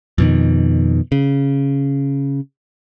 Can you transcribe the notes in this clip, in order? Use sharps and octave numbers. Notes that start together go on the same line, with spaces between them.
F2 B2 D#3
C#3